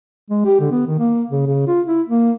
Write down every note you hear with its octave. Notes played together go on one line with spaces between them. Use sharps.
G#3
G4
D3
B3
D#3
A#3
C#3
C#3
F4
E4
A#3